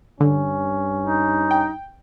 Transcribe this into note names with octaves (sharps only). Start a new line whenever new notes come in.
G2 D3 C#4
D#4
G5